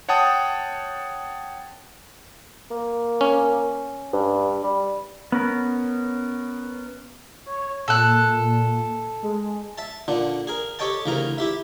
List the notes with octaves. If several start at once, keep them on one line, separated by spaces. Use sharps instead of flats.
C#5 F#5 G5 A5 D#6
A#3
C#4
G2
G3
B3 C#4 A#4
C#5
A#2 A4 F#6
G#3
E5 A5
A#2 D3 D4
G#4 A#4
G4 A4 C#5 D#5 G5 A5
D2 C#3 E3 A#4 A#5
E4 G4 E5